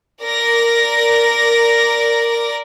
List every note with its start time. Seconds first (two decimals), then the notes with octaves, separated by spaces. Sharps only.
0.22 A#4 D5 A#6